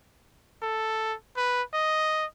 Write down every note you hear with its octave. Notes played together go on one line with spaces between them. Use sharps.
A4
B4
D#5